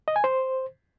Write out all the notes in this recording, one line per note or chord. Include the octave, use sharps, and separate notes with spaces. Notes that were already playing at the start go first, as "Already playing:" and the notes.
D#5
G#5
C5